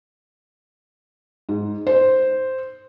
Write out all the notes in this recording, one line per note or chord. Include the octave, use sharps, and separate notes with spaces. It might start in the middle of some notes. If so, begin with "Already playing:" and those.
G#2
C5